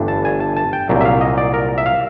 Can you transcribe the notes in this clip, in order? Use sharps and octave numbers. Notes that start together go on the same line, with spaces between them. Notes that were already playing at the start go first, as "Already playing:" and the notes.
Already playing: G1 G2 E3 A3 D4
A5
G#5
A5
A5
G5
C2 A#2 F#3
E5
F5
D#5
D5
A#4
E5
F5